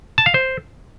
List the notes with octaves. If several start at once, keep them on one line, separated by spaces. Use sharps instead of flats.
A5
F5
C5